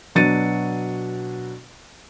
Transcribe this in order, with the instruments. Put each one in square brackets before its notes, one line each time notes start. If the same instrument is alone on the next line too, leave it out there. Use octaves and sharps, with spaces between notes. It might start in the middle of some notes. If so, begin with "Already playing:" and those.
[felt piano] B2 F#3 D4 A6 C#7 D#7